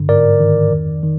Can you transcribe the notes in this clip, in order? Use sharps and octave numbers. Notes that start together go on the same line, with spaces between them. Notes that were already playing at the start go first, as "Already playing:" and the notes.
Already playing: G2 D3
G#2 A#4 D5
D#3
F2
D#3